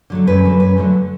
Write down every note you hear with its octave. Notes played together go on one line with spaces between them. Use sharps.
D3 F#3 A3
F#2 B4
D3 F#3 A3
F#2 B4
D3 F#3 A3